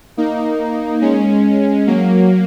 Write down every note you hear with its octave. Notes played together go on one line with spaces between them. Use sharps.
A#3 D#4
G#3 C#4
F#3 A#3